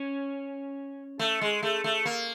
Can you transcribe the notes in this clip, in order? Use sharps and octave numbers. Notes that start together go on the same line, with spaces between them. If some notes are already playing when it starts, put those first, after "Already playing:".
Already playing: C#4
A3
G#3
A3
A3
A#3